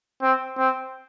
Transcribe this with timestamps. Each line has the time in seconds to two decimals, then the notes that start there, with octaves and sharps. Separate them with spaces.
0.23 C4
0.58 C4